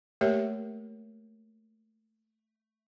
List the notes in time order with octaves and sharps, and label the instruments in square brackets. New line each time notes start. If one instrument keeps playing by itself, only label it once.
[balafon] A3 A#3 G4 A#4 C#5 E5